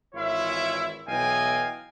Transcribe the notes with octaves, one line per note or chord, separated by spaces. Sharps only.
G#1 E3 E4 F4 C#5 E5
B1 E3 D#5 F5 G5 G#5